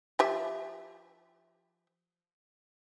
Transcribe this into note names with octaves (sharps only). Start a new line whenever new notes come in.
F3 G4 E5